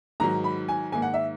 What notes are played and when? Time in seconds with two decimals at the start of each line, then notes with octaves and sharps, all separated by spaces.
0.20 G#2 D#3 F#3 A#5
0.44 B5
0.69 G#5
0.92 G#2 D#3 A#3 G#5
1.02 F#5
1.14 E5